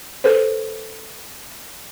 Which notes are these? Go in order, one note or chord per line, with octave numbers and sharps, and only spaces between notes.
A4 B4 C5